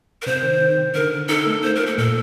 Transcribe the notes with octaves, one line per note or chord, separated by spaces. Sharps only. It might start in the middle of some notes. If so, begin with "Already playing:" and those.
A#4
C3 C5
D#3
D#3
D#3
D3 A#4
D3
D#4 A4
A3
A#3 C5
A#4
F3
A4
A#2 A4